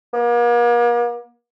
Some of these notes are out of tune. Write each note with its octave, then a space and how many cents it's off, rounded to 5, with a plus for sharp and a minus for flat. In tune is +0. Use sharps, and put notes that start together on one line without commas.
A#3 +40